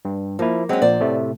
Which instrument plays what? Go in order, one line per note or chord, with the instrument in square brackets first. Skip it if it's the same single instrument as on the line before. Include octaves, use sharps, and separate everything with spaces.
[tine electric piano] G2
[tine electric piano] F3 E4 [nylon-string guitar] A#3
[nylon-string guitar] F#3 C#4 [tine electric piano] G#3 C4
[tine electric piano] A#1 A#2 [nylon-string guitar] C5 D5
[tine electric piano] A2 C3 A3